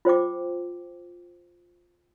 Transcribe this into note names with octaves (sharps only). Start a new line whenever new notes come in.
F4 C5 G5 D6